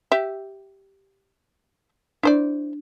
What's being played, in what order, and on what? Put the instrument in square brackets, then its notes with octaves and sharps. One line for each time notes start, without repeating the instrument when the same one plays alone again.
[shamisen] G4 E5
[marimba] D4 [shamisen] E4 C5 D5